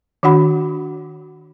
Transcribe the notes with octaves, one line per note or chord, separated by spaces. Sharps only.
D#3 D4 F#4 F#5 B5